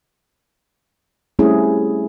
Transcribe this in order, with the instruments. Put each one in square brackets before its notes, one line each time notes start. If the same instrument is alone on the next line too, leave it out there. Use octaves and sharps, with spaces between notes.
[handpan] G3 A3 C4 C#4 E4 G#4